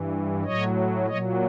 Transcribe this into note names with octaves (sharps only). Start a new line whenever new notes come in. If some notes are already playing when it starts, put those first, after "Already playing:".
Already playing: G2 E3
A2 F#3 C#5 D#5
A#2 F#3 C#5 D#5